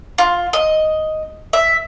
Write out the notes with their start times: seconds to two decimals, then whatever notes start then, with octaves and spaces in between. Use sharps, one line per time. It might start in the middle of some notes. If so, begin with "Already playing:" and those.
0.18 F4
0.53 D#5
1.53 E5